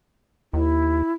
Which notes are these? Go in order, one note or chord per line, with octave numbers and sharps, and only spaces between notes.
D#2 E4